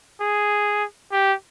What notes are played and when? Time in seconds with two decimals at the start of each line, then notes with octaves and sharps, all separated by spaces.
0.21 G#4
1.12 G4